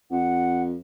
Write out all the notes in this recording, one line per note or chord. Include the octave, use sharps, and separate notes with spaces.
F2 F#5